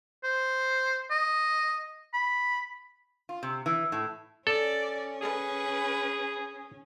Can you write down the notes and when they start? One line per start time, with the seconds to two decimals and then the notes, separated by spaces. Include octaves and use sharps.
0.24 C5
1.11 D#5
2.14 B5
3.29 F4
3.43 C3
3.66 E3
3.92 A2
4.47 C#4 A4 D5
5.21 G#4 B4